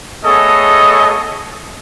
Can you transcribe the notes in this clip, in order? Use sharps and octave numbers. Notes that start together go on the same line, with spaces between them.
A3 B3 G#4 A4 C#5 D#5